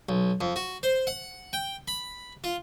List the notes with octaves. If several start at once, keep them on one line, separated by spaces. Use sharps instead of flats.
B1
F2
F#4
C5
F#5
G5
B5
F4